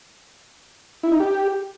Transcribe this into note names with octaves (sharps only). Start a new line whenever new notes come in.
E4
D#4
G4